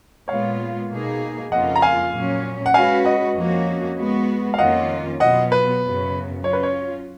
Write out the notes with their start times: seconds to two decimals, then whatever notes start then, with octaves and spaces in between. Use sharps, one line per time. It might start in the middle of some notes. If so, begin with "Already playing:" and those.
0.28 A#2 G#3 B3 F4 C#5 F5
0.90 B2 A#3 D#4 G#4
1.51 F2 C#3 F3 A#3 F4 D#5 F#5
1.76 A#5
1.82 F5 G#5
2.13 A#2 F#3 C#4
2.66 F#5
2.74 G#3 C#4 F#4 B4 F5 G#5
3.05 D#5 F#5
3.35 F2 F3 A#3 C#4 F#4
3.98 G#3 B3 F#4
4.54 F5
4.58 F2 D#3 A#3 C#4 F4 D#5 F#5
5.20 B2 F#3 B3 F4 D#5 F#5
5.52 B4
5.82 F#2 C#3 F#3 B3
6.43 F#3 C#4 F4 C#5
6.53 B4
6.63 C#5